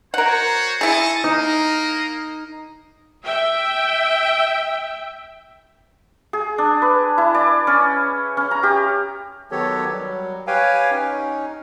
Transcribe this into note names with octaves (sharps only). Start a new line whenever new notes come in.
F#4 A#4 C5 C#5 F#5
E4 G#4 D#5 A5 C#6
A#3 D#4 A#4 D#5
E5 G5
G#4
D4
B4
E4
D5
C#4
C#4
A#5
G4
D#3 F#3 B3 G4 A4 C#5
F#3 G3
G4 B4 C#5 F5 G5 G#5
C#4 D#4